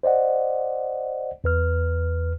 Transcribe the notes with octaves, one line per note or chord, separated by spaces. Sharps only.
C5 D5 D#5 F#5
E2 B4 F6